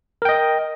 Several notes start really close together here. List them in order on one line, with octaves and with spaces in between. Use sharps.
A#4 G5 D#5